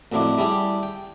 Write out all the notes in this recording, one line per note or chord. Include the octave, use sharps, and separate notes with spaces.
A1 F2 F#3 D4 E4 D6
G3 D4 E4 G4 G#4
G5